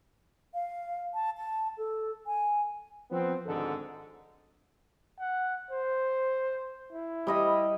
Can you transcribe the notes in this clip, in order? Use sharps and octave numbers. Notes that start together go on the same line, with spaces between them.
F5
A5
A5
A4
G#5
F3 B3 C4
G#1 D2 G#2 D3 A4
F#5
C5
E4
G3 D#5 B5